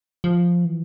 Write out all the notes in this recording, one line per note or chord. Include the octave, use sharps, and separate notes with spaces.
F3
E3